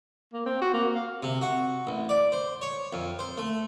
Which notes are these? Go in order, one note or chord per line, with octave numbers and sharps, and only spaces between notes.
A#3
C4
F#4
A#3
F5
C3
F#4
A1
D5
C5
C#5
F2
C5
A3